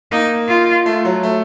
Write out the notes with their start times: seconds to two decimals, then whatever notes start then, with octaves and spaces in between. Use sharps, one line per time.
0.12 A#3 D#4
0.48 F4
0.86 A3
1.05 F#3
1.23 A3